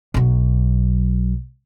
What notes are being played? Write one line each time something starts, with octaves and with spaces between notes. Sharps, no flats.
B1 F#3